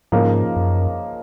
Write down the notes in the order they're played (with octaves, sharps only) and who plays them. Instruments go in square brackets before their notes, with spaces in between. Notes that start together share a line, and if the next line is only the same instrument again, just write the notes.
[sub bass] G#2 [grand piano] C#3 F3 A#3 D#4
[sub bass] F#2